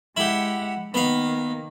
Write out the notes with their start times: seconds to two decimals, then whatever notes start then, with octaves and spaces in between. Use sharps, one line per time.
0.17 G#3 E4 G4 F#5
0.94 D#3 A#3 B3 F5